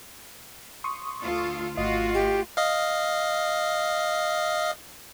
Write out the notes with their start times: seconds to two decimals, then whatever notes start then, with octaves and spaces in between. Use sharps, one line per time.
0.84 C6 C#6 D#6
1.23 D2 F4 A4
1.77 G#1 A3 F4 F#4 D#5
2.14 G4
2.57 D#5 F5